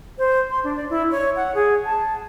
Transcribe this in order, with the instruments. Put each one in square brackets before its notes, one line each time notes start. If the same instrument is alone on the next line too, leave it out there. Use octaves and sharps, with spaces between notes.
[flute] C5
C6
D4
D5
E4
C#5
F#5
G#4
A5